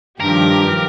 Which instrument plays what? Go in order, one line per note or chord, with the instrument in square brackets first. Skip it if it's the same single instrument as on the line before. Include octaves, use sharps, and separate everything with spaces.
[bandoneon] G2 [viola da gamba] D#3 F3 [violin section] G4 D6 A#6 [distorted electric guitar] A#4